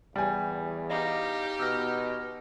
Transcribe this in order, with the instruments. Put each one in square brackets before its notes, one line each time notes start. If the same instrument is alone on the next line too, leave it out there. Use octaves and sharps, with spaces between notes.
[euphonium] E2 [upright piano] G3 G#5
[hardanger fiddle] D#4 G4 [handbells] D#5 F5 A#5
[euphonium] B2 [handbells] E6 F6 A#6